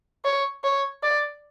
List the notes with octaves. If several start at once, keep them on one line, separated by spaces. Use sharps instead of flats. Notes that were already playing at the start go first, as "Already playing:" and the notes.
C#5
C#5
D5